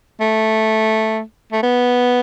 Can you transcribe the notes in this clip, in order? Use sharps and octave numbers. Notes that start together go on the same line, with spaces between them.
A3
A3
B3